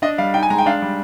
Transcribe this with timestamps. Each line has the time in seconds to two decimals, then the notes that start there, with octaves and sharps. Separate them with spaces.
0.02 D4 D#5
0.18 G3 F5
0.34 D#4 G5
0.43 G#5
0.50 G#3 A#5
0.58 G5
0.66 D4 F5
0.82 G3